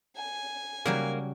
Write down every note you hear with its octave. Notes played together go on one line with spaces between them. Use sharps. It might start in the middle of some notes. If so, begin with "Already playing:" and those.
G#5
C#3 F#3 G3 A#3